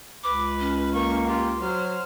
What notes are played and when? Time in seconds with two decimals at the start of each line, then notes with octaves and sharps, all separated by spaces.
0.24 C#2 B4 D6
0.60 C#4
0.94 A#3 C#6
1.26 F4 G4
1.61 F#3 C5 F6